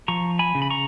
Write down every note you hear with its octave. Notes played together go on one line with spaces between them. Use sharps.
F3 A#5 C#6
G#5 B5
C#3
B5
A#5 C#6